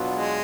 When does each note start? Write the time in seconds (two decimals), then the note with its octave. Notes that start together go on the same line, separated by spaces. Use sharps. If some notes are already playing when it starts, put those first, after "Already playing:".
Already playing: B2 F#3 B3 D4 F4
0.14 G#3